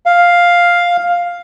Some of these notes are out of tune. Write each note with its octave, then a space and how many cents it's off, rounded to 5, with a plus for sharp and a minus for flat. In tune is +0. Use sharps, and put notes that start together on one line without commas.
F5 +5